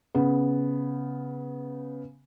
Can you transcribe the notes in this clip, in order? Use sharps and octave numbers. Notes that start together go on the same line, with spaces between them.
C#3 B3